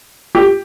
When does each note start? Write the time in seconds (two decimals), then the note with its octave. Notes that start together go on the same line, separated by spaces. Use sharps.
0.35 G4